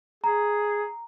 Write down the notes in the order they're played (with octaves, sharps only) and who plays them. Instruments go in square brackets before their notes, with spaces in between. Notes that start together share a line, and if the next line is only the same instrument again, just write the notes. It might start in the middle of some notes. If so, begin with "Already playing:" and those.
[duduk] G#4 [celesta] A#5